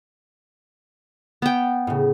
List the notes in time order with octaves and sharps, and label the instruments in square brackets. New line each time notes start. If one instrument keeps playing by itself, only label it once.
[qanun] B3 G5
[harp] A2 C#3